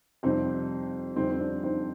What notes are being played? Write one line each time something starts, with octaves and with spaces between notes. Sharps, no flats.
F2 C3 G3 C4 D#4
F2 D3 G3 C4 D#4
C4
D4
C4 D#4